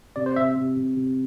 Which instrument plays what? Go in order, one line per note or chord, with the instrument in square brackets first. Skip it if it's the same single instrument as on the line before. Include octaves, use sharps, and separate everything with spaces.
[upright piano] C3 [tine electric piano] D5
[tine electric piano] C5
[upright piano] C3 [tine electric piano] E5
[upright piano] C3
C3
C3